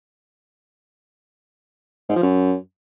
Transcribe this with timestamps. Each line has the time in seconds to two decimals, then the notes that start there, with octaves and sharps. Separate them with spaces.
2.09 G#2
2.16 F3
2.23 F#2